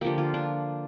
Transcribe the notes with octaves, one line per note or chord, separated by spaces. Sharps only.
D3 F3 A#3 G4
F4
D4